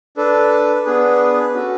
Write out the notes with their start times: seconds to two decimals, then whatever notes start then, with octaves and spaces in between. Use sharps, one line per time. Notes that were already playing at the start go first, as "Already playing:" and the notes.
0.17 D4 A4 B4
0.85 B3 D4 G#4 B4
1.53 C#4 F#4 A4